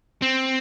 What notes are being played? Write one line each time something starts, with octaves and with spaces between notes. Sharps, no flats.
C4